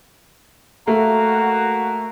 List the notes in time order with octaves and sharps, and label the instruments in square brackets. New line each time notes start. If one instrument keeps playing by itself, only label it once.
[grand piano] A3 [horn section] A#3 F#4